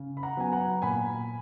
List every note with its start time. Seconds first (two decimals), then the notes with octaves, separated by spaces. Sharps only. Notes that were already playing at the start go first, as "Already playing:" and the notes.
Already playing: C#3
0.17 B5
0.23 F#5 A#5
0.37 F#3 B3 G#5
0.52 F#5 A#5
0.82 A#2 G#5 B5